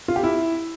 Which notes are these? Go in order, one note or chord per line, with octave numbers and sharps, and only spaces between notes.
F4
G4
E4